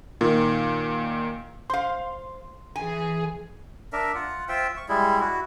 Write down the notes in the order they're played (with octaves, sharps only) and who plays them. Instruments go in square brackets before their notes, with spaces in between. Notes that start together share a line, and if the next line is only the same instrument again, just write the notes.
[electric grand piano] A#2 D#3
[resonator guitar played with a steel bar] C5 F5 [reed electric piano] C6
[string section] E3 G#4 [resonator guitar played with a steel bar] G#5
[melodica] D4 A#4 E5
F4 F#5
F4 C5 E5 G5
C#6
G3 G#3 E4
E4 F#4